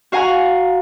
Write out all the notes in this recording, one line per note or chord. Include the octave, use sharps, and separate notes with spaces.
F#4 F5 F#5 G#5 A#5